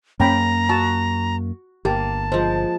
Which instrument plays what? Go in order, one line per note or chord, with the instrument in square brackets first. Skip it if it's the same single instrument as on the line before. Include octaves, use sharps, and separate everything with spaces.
[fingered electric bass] F#2 A#3 [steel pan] C#4 G5 B5 [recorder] A#5
[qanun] F#4 [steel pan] A5
[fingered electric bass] G1 [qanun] A#3 [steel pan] G4 [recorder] A5
[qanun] F3 G#3 [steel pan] C5